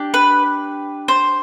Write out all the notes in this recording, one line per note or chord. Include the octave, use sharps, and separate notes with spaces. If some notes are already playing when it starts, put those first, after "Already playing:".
Already playing: D4 G4
B4
C5